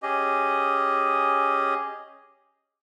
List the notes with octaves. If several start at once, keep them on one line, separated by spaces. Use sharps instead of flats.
C#4 G4 G#4 D#5